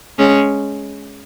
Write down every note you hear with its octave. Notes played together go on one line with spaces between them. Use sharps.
G#3 C#4